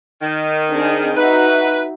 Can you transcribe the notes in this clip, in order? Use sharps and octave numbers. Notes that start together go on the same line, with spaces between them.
D#3
C4 D4 G#4
D#4 F#4 B4 E5